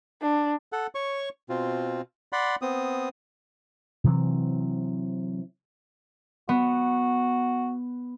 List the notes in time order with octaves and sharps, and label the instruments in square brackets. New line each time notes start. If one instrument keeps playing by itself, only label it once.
[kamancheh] D4
[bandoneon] A4 F#5
C#5 C#6
B2 C4 F4
D5 F#5 B5 C6
B3 C4 D#6
[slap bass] C3 E3 F#3 C4
[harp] B3 [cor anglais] F#4